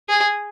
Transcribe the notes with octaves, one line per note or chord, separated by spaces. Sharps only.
G#4